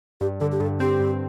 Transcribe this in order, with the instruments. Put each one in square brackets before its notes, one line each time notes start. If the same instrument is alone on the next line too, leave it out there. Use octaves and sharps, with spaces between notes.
[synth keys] G2 [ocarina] G4
[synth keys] D3 [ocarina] A4
[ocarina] G4
[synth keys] G2 [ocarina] A4
[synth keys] C4 [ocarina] G4
[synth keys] G2